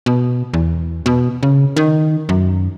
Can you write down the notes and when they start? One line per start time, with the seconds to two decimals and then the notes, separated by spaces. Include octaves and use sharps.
0.06 B2
0.54 E2
1.06 B2
1.43 C#3
1.76 D#3
2.29 F#2